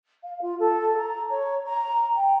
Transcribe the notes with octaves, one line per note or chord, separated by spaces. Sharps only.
F5
F4
A4
A#5
C#5
A#5
G5